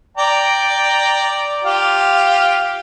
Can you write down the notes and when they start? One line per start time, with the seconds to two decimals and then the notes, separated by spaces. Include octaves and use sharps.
0.17 D5 G5 A#5
1.64 F4 G4 F5